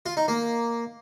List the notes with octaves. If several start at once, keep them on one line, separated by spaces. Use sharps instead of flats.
F4
D#4
A#3